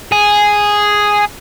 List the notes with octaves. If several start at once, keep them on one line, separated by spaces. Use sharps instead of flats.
G#4